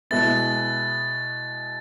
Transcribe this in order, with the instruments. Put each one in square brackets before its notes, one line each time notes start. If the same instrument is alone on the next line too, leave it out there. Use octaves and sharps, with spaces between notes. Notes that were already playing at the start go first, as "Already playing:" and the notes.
[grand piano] B2 G#3 B3 E4 [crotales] A6